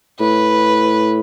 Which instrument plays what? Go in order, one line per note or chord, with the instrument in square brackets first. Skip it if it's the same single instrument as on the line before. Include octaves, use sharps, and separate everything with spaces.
[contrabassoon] A2 [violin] B4